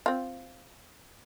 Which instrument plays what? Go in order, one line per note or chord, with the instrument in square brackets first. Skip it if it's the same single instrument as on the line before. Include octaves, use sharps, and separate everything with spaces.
[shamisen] C4 F4